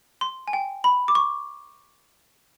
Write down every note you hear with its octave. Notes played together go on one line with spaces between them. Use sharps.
C6
G#5
G5
B5
D6
C#6